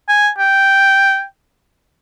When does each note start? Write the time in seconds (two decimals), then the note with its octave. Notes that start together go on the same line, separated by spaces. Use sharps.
0.09 G#5
0.39 G5